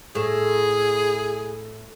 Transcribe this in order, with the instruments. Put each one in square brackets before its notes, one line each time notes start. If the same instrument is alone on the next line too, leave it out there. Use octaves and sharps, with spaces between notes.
[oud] A2 [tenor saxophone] G#4